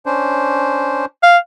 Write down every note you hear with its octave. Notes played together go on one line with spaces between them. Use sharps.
C#4 D4 C5
F5